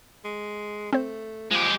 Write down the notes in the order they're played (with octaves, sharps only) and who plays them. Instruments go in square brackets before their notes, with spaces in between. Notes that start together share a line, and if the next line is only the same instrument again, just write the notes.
[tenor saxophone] G#3
[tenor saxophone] A3 [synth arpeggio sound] C4 C5
[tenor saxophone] F3 [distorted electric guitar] G#3 G4